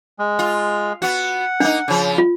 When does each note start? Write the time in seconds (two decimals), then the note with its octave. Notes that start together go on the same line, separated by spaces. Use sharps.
0.19 G#3
0.39 F4
1.02 B3 F#4 F#5
1.60 A#3 D4 D#4
1.88 C#3 F3
2.18 F4